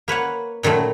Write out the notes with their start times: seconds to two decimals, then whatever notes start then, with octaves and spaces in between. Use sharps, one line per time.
0.08 A#3 B4 C#5 F#5
0.63 A#2 D#3 F#3 A3 B5